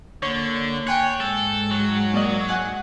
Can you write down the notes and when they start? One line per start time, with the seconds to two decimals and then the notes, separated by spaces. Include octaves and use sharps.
0.22 D3 A#3 C#5
0.87 C#5 G5 G#5 F#6
1.20 G#2 G#3 A4
1.71 F#3
2.14 A#3 D5 D#5
2.49 F#5 G#5 F#6